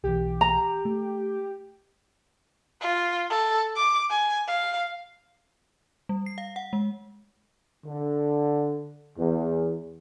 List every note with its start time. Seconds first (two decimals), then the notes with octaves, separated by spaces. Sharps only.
0.04 B1 E3 G4
0.41 A#5
0.85 A3
2.81 F4
3.30 A4
3.76 D6
4.10 G#5
4.47 F5
6.09 G3
6.26 C7
6.38 F5
6.56 F#5
6.73 G#3
7.85 D3
9.17 E2